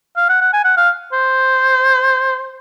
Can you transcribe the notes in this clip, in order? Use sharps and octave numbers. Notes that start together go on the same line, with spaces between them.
F5
F#5
F#5
G#5
F#5
F5
C5